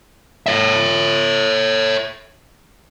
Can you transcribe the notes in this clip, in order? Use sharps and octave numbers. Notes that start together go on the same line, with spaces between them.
C#5 E5